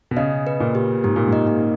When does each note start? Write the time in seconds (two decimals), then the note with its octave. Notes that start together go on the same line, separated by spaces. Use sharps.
0.11 B2
0.17 C#3 D#5
0.47 B4
0.60 A#2
0.75 G4
1.04 G#2 G4
1.16 A#2
1.28 G#2 D#5
1.47 A#2